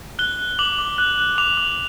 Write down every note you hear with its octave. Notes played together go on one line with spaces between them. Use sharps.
F#6 G7
F#6
D6 F#7
D6
F#6
F#6
D6 F7
D6